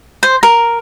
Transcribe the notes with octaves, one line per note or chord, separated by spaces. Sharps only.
C5
A#4